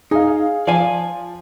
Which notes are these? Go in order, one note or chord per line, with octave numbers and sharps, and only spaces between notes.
D#4 G#4 F5
F3 D5 F5 G#5